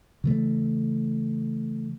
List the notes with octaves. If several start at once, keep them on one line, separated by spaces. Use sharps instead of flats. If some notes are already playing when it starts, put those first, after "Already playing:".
C#3 E3 A3